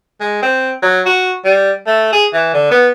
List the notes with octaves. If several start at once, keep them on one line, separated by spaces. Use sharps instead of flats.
G#3
C4
F#3
F#4
G3
A3
G#4
E3
D3
B3